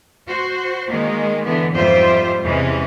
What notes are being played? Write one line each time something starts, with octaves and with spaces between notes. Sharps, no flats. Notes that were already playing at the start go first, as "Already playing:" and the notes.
F#4 C5
D#3 G#3 A#3
D3 E3 B3
F2 G#2 G3 F4 C5 E5
E2 C3 E3 G#3 C#4